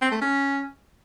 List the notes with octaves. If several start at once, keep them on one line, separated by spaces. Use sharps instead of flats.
C4
A3
C#4